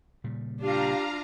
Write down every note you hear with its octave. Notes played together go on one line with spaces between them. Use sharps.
A#2 C#3 G3
D4 F4 G4 F5 A#5